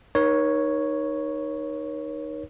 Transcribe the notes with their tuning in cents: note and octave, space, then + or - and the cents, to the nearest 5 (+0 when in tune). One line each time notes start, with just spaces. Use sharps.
D#4 -15 A#4 +45 C#5 +0